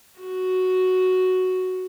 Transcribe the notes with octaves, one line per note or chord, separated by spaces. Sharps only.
F#4